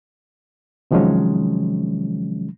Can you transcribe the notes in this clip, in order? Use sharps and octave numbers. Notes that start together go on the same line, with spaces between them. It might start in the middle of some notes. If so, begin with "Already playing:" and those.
C3 D#3 F3 F#3 G#3 C#4